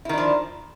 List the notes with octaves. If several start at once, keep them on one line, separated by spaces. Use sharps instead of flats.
D#3 F3 D4 E4